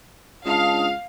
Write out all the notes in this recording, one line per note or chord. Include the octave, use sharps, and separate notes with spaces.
C#2 D4 F5 A5 D#6